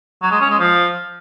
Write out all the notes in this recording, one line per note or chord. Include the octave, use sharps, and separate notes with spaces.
F#3
G#3
C#4
G#3
F3